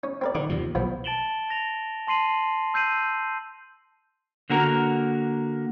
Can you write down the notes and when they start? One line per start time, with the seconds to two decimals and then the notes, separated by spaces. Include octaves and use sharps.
0.04 C#4
0.21 C4 A#4 D5
0.35 D3 D#3 D6
0.49 D#2 C3 F3
0.75 B1 F3 B3
1.04 A5 A6 D7 E7 F#7 G7
1.49 A6 A#6 F7
2.07 A5 C6 C7 D#7 F#7
2.74 E6 G6 C7 D#7 F#7
4.50 D3 A#3 F#4 A#4